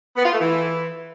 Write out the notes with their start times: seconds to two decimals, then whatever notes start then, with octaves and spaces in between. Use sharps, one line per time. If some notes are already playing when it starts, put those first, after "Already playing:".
0.17 B3
0.24 F4
0.32 A3
0.40 E3